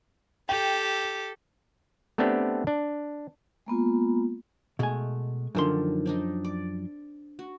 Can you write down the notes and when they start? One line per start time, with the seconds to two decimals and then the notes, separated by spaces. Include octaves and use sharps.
0.49 G4 A4 G5
2.18 A3 B3 C4 D4 G4
2.67 D4
3.66 G#3 A#3 B3 F4
4.79 B2 G#3 A3 G#5
5.55 F#2 D3 D#3 F3 D4 C6
6.06 C4 D4 D#4
6.45 D5
7.39 F#4